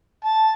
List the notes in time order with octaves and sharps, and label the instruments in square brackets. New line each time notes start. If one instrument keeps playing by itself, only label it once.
[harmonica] A5